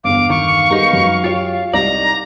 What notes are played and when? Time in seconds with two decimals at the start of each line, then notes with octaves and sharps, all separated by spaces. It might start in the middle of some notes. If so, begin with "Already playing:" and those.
0.04 G1 E2 F5 D6
0.30 D#3 C#6
0.71 G3 B3 D#4 G#4 A#4
0.93 F#2
1.24 F4 G4 C#5
1.74 C2 D#4 D5 A#5